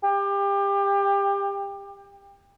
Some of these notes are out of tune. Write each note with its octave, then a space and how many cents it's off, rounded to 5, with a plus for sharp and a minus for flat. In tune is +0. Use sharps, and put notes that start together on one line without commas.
G4 +25